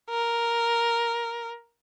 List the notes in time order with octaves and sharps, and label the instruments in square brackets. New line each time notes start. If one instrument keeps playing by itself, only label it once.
[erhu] A#4